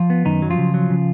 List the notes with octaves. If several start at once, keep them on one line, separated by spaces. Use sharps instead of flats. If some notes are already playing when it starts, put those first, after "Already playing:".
Already playing: F3 F4
B3
F#2 D#3 D#4
F#3
F3 F4
C#3
F#3
C#3